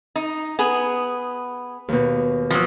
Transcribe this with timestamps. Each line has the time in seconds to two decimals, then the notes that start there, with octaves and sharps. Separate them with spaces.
0.16 D#4
0.59 B3 G#4
1.88 D#2 B2
2.50 F3 F#3